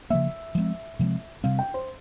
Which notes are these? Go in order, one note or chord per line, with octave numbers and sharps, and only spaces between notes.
C#3 F3 A#3 E5
F3 G#3 C4
C3 F3 G#3 C4
C3 G3 C4 F5
G5
C5